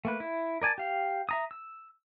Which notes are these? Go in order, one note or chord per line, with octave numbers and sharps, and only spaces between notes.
A3 A#3 B4
E4
A#4 D5 G#5 A5
G4 F5
E5 A#5 D#6
E6